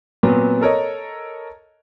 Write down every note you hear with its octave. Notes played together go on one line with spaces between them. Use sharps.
A#2 F#3 B3 C4
A4 A#4 C#5 D#5